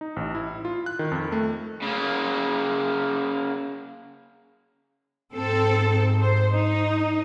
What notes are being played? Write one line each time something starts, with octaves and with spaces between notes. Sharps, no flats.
D#4
A1
E4
F4
F#6
D#3
F2
A3
C#3 A#3
G#2 C4 A4
C5
D#4